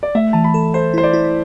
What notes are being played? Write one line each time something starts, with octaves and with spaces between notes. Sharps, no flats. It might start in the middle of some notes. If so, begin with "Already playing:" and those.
D5
A3 E5
E3 A5
B5
A4
A4 C5
E4 C5
D5
E4